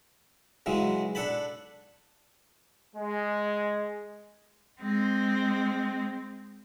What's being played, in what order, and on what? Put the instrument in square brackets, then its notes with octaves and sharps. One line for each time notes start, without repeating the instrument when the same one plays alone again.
[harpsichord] C#3 E3 F#3 G#3
D4 A4 F#5 A5 B5
[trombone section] G#3
[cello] G#3 C4